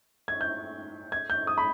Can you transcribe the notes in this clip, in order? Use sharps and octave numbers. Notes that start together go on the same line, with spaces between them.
G#6
G6
G#6
G6
D#6
B5